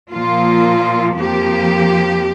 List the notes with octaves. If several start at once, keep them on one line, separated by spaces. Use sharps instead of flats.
A#2 F3 A#3 F4
F2 F3 A#3 G4